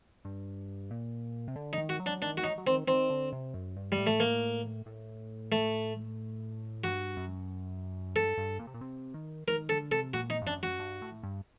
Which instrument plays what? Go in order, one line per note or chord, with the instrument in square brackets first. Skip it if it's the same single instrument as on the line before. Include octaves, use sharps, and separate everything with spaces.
[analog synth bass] G2
A#2
C3
D3
[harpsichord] D#4
[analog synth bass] D#3
[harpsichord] F#4
[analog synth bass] F#3
[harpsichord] D4
[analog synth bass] D#3 [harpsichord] D4
[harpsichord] F#4
[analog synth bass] F#3 [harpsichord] D#4
[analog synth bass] F#3
[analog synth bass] D#3 [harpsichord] C4
[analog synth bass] D#3 [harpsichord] C4
[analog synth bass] D3
C3
F#2
G2
[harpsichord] G3
[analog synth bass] A2
[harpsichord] A3
A#3
[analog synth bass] A2
[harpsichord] A3
[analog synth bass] G2 [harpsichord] F#4
[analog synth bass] F#2
[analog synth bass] G2 [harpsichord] A4
[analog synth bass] G2
A#2
C3
A#2
C3
D#3
[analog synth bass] D#3 [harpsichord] A#4
[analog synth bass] D3 [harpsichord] A4
[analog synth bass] C3 [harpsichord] A4
[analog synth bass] A#2 [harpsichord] F#4
[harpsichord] D#4
[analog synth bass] G2
[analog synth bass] F#2 [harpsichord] D4
[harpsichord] F#4
[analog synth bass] G2
A2
G2